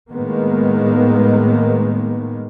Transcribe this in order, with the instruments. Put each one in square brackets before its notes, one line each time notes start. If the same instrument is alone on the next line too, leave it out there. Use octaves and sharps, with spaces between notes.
[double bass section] A2 D#3 G#3 A#3 B3